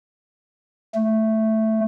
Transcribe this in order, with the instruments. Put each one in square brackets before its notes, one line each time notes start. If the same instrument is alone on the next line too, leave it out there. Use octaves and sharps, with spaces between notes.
[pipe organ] A3